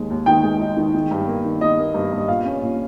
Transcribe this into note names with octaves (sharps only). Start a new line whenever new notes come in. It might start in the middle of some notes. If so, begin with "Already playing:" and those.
Already playing: D#2 D#3 G#3
D#2
D#3 G5
G#3
D#4
D#3
D#3
G2
A#3
D#3
D#3 D#5
A#3
G2
G2
D#5
A#2 F5
C#4
A#2